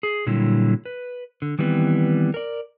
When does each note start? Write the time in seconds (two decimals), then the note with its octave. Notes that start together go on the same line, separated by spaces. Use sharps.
0.03 G#4
0.27 A#2 D3 F#3 G3 E4
0.85 B4
1.42 D3
1.59 D#3 E3 G3 B3 C4
2.34 A#4 D5